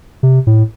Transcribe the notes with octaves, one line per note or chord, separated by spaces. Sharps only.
C3
A2